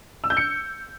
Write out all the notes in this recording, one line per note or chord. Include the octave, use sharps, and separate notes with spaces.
E6
G6
C#7